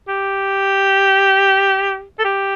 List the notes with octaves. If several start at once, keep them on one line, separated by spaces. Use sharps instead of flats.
G4
A4
G4